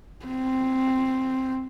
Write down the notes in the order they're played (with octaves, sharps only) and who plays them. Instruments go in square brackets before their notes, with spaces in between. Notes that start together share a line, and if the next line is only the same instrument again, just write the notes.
[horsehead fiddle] C4